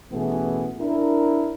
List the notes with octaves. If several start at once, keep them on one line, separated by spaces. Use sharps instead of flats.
A1 B2 E3 A3 B3 G#4
D4 E4 A#4